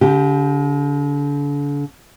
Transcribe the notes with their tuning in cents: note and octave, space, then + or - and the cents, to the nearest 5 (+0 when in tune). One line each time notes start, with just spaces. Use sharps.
D3 -40 G4 +0